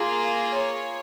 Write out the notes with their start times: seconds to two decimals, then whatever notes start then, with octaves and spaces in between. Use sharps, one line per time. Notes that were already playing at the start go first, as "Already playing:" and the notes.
Already playing: A#3 F4 G#4
0.52 C#5